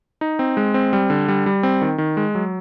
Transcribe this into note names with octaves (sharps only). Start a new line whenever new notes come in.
D#4
C4
G#3
C4
G3
D3
G3
G3
C4
D#3
D#3
G#3
F#3